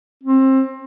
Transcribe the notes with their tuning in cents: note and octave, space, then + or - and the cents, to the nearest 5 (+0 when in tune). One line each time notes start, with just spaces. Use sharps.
C4 +25